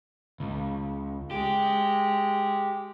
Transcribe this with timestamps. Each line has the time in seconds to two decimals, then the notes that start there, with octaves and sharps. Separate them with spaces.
0.40 C#2
1.31 G#3 G4